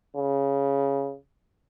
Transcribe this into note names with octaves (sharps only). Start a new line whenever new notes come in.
C#3